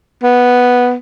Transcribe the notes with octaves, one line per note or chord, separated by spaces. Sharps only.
B3